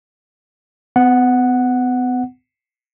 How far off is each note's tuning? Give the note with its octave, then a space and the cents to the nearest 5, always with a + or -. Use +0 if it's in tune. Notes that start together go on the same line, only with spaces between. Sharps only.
B3 +40 F#5 +0